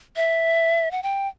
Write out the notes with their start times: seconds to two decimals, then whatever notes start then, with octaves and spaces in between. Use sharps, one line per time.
0.16 E5
0.91 F#5
1.03 G5